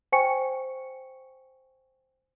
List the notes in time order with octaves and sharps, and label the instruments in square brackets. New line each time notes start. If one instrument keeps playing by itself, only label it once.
[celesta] C5 G5 G#5 C#6 C#7